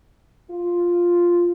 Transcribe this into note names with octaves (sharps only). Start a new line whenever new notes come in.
F4